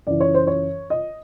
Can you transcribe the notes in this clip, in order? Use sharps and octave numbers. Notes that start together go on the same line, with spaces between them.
F#2 C#3 E3 D5
C#5
C5
C#5
D#5